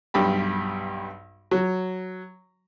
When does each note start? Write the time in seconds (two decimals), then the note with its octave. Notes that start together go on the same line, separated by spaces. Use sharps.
0.14 B1 G2 G4 B5
1.51 F#3